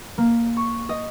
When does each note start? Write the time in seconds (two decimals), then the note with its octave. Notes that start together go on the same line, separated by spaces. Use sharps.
0.18 A#3
0.57 C#6
0.89 D#5